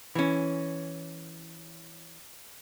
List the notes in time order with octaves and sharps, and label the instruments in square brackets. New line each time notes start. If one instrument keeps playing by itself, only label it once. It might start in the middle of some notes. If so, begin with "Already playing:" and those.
[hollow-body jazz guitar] E3 C#4